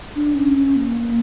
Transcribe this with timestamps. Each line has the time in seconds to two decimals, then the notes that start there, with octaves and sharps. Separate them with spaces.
0.16 D4
0.35 C#4
0.56 C#4
0.76 A#3